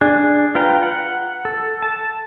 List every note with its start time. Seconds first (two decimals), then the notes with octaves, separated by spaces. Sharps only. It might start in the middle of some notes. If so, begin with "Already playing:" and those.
0.01 D4 G#4
0.55 F4 B4 G5 A#5
0.83 F#5
1.45 A4
1.82 A5